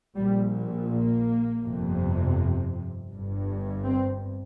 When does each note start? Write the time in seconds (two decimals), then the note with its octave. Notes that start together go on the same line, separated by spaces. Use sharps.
0.18 A#1 A#2 G3
0.91 A#3
1.65 G1 F2 C3
3.12 G1 G2
3.85 C4